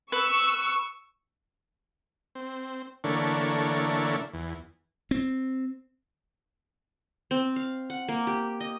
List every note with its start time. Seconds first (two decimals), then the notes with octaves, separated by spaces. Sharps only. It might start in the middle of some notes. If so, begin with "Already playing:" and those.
0.12 B4 C#6 E6
2.35 C4
3.04 D3 E3 A3 A#3 D4 C#5
4.34 E2
5.11 C4
7.31 C4
7.56 F5
7.90 F#5
8.09 A#3
8.27 G4
8.60 D#5